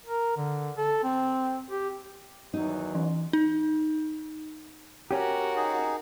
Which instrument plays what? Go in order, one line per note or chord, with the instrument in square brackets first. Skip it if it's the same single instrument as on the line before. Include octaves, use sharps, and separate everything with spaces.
[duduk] A#4
D3
A4
C4
G4
[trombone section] E2 D#3 F#3 [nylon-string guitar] D#4
[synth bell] E3
D#4
[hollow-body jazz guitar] C#4 G4 [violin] F#4 A#4
[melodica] D#4 G#4